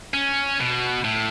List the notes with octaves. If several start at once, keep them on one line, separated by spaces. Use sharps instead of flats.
C#4
B2
A2